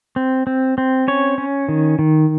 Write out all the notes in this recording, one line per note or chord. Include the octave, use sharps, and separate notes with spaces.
C4
C4
C4
C#4 C#5
C#4
D#3
D#3